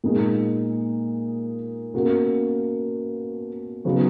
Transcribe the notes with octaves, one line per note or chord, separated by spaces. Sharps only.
A#2 G#3 D#4
B2 A#3 C#4 F#4
C#3 F#3 B3 D#4